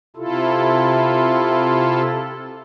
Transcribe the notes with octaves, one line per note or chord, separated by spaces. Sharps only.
C3 E4 F4 A4